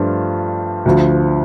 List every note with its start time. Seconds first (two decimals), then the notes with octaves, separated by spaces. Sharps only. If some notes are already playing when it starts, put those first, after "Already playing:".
Already playing: G2 F3 A3 D4 F4
0.86 D2 D3 F3